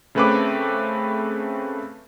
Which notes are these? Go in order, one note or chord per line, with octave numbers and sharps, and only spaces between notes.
C#3 A3 C4 B4 C#5 D6